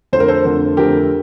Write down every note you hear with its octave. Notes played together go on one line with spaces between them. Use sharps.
F2 D3 A3 C5
A#4
A4 C5
F2 D3 A3
F2 D3 A3 G4 A#4